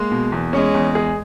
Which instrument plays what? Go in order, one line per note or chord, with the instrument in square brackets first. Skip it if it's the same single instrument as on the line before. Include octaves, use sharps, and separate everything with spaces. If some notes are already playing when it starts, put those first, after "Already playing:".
Already playing: [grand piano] G#3 [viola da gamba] A#3
[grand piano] B2
E2
[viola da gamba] G#3 [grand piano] C#4
[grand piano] E2
G#4